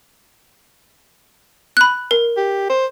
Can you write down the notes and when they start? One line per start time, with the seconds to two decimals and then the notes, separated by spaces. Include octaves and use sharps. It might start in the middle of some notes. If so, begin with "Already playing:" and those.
1.77 B5 F#6
2.11 A#4
2.37 G4
2.70 C5